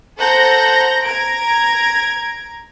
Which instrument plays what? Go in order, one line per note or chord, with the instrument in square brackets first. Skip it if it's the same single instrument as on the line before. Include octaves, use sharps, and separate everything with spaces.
[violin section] A4 C5 F#5 A#5 G6 A#6
A#5 G#6 D7